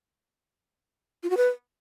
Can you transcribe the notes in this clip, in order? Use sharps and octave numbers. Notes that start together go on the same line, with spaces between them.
F4
F#4
B4